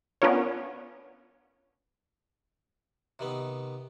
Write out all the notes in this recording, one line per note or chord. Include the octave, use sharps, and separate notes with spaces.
B3 C#4 D4 F4 A#4 C#5
C3 D#3 B3